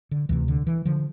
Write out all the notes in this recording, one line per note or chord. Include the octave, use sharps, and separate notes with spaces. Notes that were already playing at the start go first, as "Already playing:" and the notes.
D3
D2 C3 E3
D3
E3
D3 F3